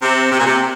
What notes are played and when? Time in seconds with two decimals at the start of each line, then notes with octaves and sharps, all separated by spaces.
0.01 C3
0.31 C3
0.39 A#2
0.46 C3